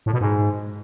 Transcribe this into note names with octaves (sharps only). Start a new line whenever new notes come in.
A2
B2
G#2